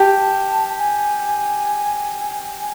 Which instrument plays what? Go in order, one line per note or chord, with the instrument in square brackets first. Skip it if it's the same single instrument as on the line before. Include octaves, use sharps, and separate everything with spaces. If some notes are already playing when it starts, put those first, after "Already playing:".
Already playing: [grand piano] G4 [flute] A5
[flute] G#5
G#5